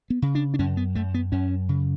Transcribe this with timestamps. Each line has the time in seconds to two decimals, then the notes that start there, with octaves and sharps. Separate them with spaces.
0.10 B3
0.22 C#3
0.35 D4
0.54 D4
0.59 F#2 C#4
0.77 B3
0.95 F#2 A3
1.14 B3
1.32 F#2 C#4
1.69 C#3